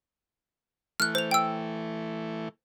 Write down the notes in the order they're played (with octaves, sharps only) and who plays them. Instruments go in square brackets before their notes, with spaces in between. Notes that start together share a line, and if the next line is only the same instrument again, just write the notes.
[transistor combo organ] E3 A3 [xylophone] F6 F#6
[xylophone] C5 F7
G5 E6